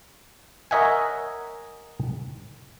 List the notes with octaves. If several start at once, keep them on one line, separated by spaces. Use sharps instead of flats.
A#4 C#5 D#5 E5 F#5 G#5